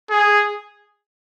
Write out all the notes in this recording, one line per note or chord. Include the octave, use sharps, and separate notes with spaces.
G#4